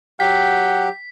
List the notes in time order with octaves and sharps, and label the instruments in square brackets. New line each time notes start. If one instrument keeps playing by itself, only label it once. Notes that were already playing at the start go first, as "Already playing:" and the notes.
[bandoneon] F#3 G4 [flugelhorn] F#5 [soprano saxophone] G5 [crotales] B6